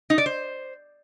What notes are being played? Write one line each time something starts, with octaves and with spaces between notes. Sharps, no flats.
D#4
D5
C5